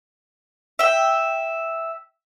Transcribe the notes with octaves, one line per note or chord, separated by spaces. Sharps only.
E5 G5